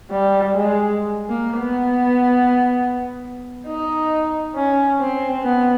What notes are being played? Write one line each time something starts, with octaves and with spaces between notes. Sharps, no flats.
G3
G#3
A#3
B3
D#4
C#4
C4
B3